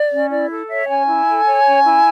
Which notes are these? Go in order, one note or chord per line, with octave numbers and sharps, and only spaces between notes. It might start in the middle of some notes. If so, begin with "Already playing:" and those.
Already playing: D5
C#4
E4 D5
A4
C#5 E5
C#4 G#5
E4
A4
C#5
C#4
E4